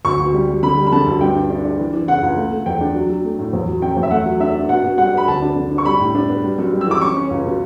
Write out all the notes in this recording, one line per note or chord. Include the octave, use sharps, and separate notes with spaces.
D2 C#6
D2
G3
G3
D3 B5
G3
B5
D3 A5
D2
G2 G5
D4
D4
D4
E3
E3
C#3 F#5
C#2
A3
A3
E2 G5
D4
F#3
F#3
A3
A2
E2
F#3
C#4 G5
E2
E5
A3 F#5
F#3
D4 E5
D4
B2 F#5
B2
G3 F#5
B3 B5
D2 A5
D4
D3
D4
C#6
G3 B5
A2
D4
B3
G3
F#2
G3
E6
E3 D6
C#4 C#6
C#4
C#2
B2